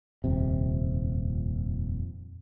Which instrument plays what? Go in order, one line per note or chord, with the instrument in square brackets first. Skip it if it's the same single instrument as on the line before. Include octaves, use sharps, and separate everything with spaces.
[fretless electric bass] D#1 C3 [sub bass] F2